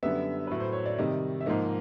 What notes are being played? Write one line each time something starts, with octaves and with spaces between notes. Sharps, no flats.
F#2 D3 G3 B3 E5
A2 F#3 A3 B4
C5
C#5
D5
C3 D#3 G3 D#5
E5
G#2 F3 A#3 D#5